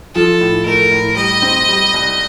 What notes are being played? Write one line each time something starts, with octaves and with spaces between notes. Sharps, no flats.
F3 A4
A2
A3 A#4
A2
G3 D#5
C4
G3
C2